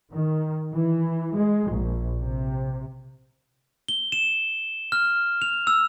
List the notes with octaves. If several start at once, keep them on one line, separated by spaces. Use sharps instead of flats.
D#3
E3
G#3
A#1
C3
G7
E7
F6
F7
E6